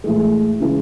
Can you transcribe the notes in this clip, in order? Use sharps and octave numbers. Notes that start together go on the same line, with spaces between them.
A2 E3 G#3
C#3 E3 G#3